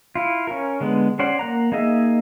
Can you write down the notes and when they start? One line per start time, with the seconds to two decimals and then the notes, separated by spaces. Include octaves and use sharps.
0.15 E4 F4
0.47 C#4 A#4
0.80 D3 G#3 B3
1.19 C#4 C5 D5 F#5
1.39 A#3 F#5 A#5
1.72 A#3 D#4 G#4 D#5 E5